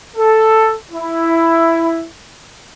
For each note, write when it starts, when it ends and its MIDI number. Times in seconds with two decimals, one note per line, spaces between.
0.17 0.75 69
0.92 2.06 64